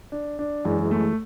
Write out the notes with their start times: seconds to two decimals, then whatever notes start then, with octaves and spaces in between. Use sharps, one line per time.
0.12 D4
0.39 D4
0.65 F#2 E3 G#3
0.91 A3